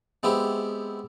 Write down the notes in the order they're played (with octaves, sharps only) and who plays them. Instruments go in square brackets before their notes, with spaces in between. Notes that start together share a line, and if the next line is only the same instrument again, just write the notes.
[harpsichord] G#3 B3 C4 E4 G4